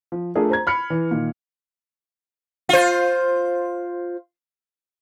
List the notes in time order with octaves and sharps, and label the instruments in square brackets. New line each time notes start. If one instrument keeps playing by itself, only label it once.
[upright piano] F3
A3 D4 F4 G#4 A#4
C5 A#5 G#6
B5 F6 C#7
E3
A#2 D#3
[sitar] F4 C5